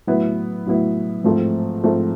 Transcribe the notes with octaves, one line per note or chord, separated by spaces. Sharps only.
A2 F#3 B3 E4
A2 F#3 B3 E4
G#2 F3 A3 C4
G#2 F3 A3 C4